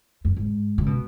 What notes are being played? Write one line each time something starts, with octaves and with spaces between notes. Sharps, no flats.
F#2
G#2
C#3
B2